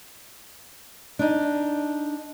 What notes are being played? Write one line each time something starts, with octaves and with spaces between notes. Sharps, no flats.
D4 D#4